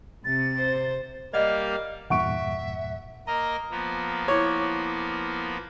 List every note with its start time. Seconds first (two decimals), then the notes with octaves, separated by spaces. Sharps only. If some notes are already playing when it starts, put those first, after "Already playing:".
0.25 C3 A6
0.58 C5
1.33 G3 A#3 D5 D#5 F5 F#5
2.10 E2 G2 A#2 E5 F#5 C#6 D7
3.27 A#3 A#4 D#5 A#5
3.71 F3 A#3 B3
4.28 E4 C#5 D6